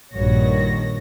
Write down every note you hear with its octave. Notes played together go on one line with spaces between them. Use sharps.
A#1 G2 D#3 F#4 C#5 A#6